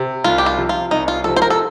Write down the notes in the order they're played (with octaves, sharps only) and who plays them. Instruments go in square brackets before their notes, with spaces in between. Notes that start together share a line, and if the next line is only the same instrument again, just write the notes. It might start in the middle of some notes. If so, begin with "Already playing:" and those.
Already playing: [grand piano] C3
[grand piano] C2 [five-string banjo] F4
[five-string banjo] G4
F4
[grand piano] C3 F3
[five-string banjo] F4
[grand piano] C2 [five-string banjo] D#4
[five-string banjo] F4
[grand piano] C3 F3 [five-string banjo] A4
[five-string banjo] C5
A#4
A4